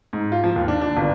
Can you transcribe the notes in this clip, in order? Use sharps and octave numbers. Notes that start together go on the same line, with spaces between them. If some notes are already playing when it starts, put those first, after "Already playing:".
G#2
F4
F3
D#2
D4
D4
G1